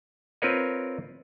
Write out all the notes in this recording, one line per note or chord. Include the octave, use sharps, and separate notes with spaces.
C4 F4 A#4 B4 C#5 D#5